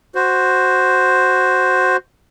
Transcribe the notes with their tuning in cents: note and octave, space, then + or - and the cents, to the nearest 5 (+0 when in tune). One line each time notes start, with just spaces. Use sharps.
F#4 +0 C5 +0